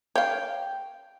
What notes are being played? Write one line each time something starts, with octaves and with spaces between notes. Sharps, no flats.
C#5 F5 G5